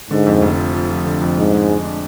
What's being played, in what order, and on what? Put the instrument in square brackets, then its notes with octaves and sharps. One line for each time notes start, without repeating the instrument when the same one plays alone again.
[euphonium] G#2 [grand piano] D3
[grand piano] F2
F1
F3
F3
F3
D3
F2
[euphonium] G#2 [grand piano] D4
[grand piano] G#3
G#3
D4